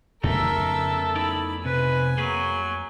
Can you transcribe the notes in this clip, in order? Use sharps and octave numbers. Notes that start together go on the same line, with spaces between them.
F2 C#3 A3 B3 D#4 A4 A#4 E5
D#4 E4 D5 B5
C3 B4 G#5
F#3 A#3 G#4 B4